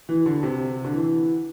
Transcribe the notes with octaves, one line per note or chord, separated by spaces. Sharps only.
E3
D3
C3
D3
E3